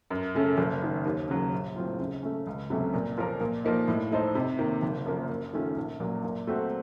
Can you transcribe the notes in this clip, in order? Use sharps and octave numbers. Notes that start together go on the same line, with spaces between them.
F#2
C#3 A3 C#4 A4
F#1
F#2 D#3
D#2
C#3 F#3
A#1
A2 F#3 C4 F4
C#3
A3 C#4
C#2
C3 F#3 A3 C#4
A#2
F3 A#3 F4 A#4
A#2
F3 A#3 D#4
A2
A3 D#4 A4 C5
C3
D#3 A#3
F#1
F#2 F3 A#3
F#2
D#3 A3 C#4 F4
A#1
A#2 F#3
A#2
A3 C4 F#4